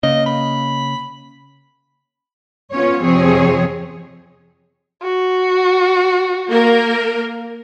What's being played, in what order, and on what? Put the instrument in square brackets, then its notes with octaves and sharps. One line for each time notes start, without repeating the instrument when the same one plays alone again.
[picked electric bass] C#3 A#3 [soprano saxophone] D#5
[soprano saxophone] B5
[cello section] B3 C#4 F4 C#5
F2 C3 F3 C4 G#4 C#5
[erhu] F#4
[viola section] A#3 A#4